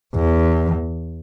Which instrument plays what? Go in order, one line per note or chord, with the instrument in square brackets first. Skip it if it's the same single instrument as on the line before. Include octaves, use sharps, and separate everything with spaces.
[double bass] E2